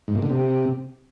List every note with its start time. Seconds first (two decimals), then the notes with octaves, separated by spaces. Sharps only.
0.08 G#2
0.15 A#2
0.22 D3
0.30 C3